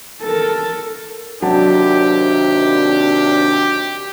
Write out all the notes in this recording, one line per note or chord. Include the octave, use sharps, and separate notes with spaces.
A4 A#4
D#2 C3 F#3 D4 G4 A5